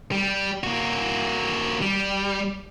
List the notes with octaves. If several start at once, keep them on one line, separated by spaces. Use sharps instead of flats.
G3
A#3 F#4
G3